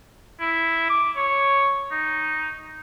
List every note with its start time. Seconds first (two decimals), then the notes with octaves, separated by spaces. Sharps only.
0.40 E4
0.90 D6
1.16 C#5
1.91 D#4